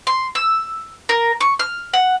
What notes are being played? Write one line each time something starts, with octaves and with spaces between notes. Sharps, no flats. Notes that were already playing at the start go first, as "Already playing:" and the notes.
C6
E6
A#4
C#6
F6
F#5